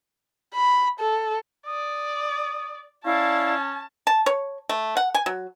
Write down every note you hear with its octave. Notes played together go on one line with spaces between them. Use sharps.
B5
A4
D5 D#6
C#4 E4 D5 F5 A5
A5
C#5
A3
F#5
G#5
F#3